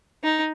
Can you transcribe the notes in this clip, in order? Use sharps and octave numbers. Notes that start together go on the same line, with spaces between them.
D#4